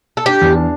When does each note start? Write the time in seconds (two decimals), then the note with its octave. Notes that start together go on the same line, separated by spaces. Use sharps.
0.17 A4
0.26 D4 G4
0.41 E2
0.55 D4